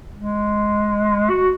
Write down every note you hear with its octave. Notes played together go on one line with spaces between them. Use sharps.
G#3
F#4